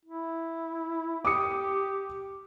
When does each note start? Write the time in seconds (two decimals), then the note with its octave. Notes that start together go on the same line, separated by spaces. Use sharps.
0.05 E4
1.25 G4 D6 D#6 C#7